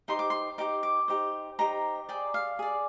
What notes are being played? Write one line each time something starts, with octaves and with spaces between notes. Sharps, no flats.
D#4 G4 C5 C6
D6
C6
D#4 G4 C5 D6
D6
D#4 G4 C5
D#4 G4 C5 A#5
G#4 D5 G5
F5
G#4 D5